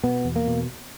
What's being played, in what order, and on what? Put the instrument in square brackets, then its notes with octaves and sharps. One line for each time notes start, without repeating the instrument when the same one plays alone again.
[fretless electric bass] B2 B3
E2
A#3
B2